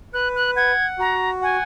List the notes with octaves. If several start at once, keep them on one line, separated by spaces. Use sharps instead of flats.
B4 F#6
F#6
F#5 G#6
F#4 A#5
F#5 G#5